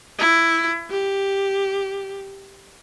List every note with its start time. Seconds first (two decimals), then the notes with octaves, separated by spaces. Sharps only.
0.19 E4
0.90 G4